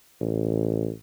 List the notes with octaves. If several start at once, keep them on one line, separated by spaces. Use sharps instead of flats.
A1